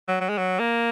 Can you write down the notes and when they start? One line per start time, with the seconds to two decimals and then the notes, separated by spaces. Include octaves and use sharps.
0.08 F#3
0.21 F#3
0.29 G#3
0.38 F#3
0.59 A#3